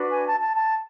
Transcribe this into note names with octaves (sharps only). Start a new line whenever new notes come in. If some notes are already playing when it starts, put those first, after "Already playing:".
Already playing: D4 F#4 B4
G#5
A5
A5
A5